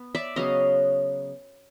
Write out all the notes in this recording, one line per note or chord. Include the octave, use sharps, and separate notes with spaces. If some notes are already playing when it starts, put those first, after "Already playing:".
Already playing: B3
D5 E5
C#3 F#3 B3 D#5 F5